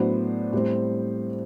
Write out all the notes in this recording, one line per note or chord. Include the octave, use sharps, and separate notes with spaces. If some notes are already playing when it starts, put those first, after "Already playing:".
Already playing: A2 F#3 B3 D4 C5
A2 G3 C4